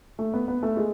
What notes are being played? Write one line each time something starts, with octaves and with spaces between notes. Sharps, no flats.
A3
B3
B3
A3
G#3